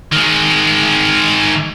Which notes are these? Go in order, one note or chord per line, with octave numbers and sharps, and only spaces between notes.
D#3 G#3